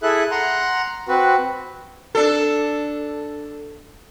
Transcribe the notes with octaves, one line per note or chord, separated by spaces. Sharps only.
E4 G#4 A4 E5 F#6
F#5 A#5 C6
C4 F#4 B4
D4 A4